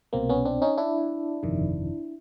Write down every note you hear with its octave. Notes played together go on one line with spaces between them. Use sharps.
C2 B2 A#3 C4
B3 C#4
C4 D4
C#4 D#4
D4 E4
G1 F2 C3 D#3